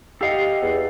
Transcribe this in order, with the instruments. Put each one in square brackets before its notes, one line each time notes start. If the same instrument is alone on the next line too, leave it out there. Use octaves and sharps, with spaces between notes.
[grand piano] G4 D#5 [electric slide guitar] A4 F5 F#5
[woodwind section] E2